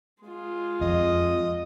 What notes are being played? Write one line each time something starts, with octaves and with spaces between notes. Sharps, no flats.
G#3 F4
F2 D#5